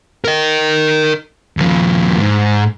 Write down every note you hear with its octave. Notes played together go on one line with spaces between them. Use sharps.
A#4 D#5
D#2 F3
G#2